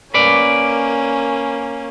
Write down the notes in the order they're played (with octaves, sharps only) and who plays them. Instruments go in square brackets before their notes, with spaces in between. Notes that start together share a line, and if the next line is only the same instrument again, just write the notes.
[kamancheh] A#3 C#4 [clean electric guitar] B4 D5